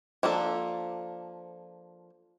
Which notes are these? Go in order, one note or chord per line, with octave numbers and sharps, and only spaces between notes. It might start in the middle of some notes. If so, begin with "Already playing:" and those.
F3 A#3 D4 A4